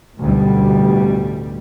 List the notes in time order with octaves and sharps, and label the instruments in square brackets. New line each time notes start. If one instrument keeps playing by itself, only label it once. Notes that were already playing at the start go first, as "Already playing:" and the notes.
[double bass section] A1 D2 B2 G3